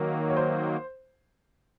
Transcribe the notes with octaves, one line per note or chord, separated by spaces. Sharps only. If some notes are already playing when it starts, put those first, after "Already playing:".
Already playing: D#3 F#3 A#3
C#5
C5